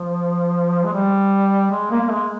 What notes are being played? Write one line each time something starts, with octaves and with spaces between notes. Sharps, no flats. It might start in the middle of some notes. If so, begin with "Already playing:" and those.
Already playing: F3
G#3
G3
G#3
A#3
A#3
G#3